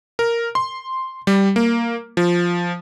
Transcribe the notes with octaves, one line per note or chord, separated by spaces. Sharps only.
A#4
C6
G3
A#3
F3